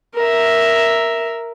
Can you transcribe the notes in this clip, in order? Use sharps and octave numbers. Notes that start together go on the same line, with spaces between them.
A#4 E5